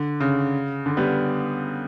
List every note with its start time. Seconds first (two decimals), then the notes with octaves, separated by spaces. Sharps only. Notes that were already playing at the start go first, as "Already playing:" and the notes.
Already playing: D3
0.20 C#3
0.86 D3
0.97 G3 B3